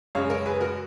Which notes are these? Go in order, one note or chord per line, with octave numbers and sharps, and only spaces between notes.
F#2 C#3 G#3 C#5 F5
A#4 C#5
G#4 B4
F#4 A#4